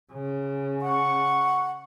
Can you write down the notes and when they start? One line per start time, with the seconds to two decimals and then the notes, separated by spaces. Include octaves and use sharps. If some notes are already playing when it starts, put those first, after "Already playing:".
0.13 C#3
0.82 F#5 C#6